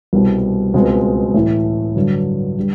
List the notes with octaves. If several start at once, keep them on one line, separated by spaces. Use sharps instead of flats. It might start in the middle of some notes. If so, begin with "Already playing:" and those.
C2 B2 G3 C4
C#2 B2 G#3 C4
A2 E3 A3
G2 D3 F#3
D3 G3